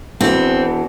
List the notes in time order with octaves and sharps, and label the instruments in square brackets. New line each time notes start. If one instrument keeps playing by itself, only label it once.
[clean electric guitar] B2 E3 B3 [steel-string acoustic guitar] C4